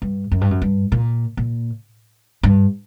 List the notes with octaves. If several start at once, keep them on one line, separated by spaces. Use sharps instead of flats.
G2
F#2
G2
F#2
G2
A#2
A#2
G2